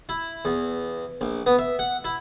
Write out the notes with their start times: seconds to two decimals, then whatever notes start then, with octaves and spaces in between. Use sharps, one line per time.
0.09 E4
0.45 E2
1.21 A#1
1.46 B3
1.59 E5
1.79 F#5
2.04 E4